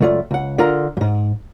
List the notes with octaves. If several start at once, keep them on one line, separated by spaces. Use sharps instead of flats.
C#2 F#2 A3 F4 D5
C#2 F#5
D3 F4 A#4 F5 A#5
F2 G#2